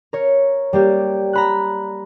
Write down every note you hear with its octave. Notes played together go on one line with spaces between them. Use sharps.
A#4 C#5
G3 A#3 G4
A#5 B5 F#6